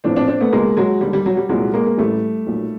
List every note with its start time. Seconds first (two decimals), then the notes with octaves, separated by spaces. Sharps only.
0.04 A#1 A2 E3 C4 D4
0.16 C4 D4
0.28 C4 D4
0.41 A3 B3
0.53 C#2 B2 G#3 A#3
0.77 F#3 G#3
1.01 D#2 D3 G3
1.13 G3
1.26 F#3
1.37 G3
1.49 C2 A#2 F#3 G#3
1.74 G#3 A#3
1.86 A#3
1.98 A1 A2 E3 G3 A3
2.47 B1 A#2